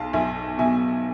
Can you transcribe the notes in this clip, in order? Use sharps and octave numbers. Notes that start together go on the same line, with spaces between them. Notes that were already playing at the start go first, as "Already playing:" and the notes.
Already playing: B1 F5 A5 C6
B1 E5 G#5
B2 E5 G#5